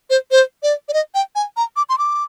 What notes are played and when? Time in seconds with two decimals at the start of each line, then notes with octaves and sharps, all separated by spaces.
0.10 C5
0.31 C5
0.63 D5
0.88 D5
0.94 D#5
1.15 G5
1.35 G#5
1.57 A#5
1.76 D6
1.89 C6
1.98 D6